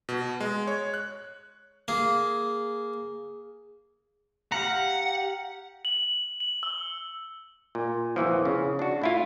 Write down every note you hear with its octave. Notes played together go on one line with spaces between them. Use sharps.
B2
G#3
C#5
F#6
A#3 G#4
G4 F5 F#5 A#5
F#7
F#7
E6
A#2
E2 A#2 E3 F3
C#3
D4 F#4
A2 E4 F4